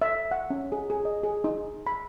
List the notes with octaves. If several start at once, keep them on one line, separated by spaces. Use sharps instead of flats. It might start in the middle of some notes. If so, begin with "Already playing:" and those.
E5
F#5
C#4
G#4
G#4
D#5
G#4
D#4
B5